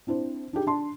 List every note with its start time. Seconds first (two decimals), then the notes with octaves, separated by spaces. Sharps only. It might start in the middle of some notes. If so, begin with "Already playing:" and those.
0.07 C4 D4 E4 C5
0.53 D4 D#4 G4 G#4
0.67 D4 A5 C6